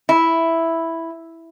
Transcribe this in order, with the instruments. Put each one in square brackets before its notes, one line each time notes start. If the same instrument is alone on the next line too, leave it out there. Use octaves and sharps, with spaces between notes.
[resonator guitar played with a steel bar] E4